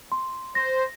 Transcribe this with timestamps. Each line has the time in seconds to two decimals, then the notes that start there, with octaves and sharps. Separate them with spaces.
0.12 C6
0.55 C5 A#6